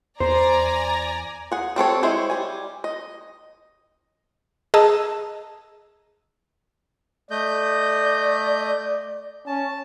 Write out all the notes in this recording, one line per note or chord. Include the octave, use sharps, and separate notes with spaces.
E2 C5 D5 G#5 A#5
G#4 F#5
G3 C4 A4 C#5
G#3 E4 C5 C#5
G3 G#5
D#5
G#4 D#5 A5 A#5 E6
A3 D5 D#5 G6
C#4 A5